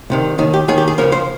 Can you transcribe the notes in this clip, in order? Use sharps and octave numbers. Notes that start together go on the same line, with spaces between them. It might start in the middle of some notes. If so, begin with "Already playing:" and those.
C2 C3 D#3
D#2 D#3 D#4
G4
D#2 D#3 G#4
G4
G#4
C#2 C#3 F3 A#4
C5